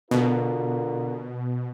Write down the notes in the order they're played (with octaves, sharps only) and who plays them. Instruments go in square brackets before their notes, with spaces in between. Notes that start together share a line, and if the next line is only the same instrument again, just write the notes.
[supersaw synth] B2 [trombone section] D3 F4 A#4